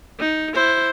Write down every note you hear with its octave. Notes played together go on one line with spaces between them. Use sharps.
D#4
E4 C5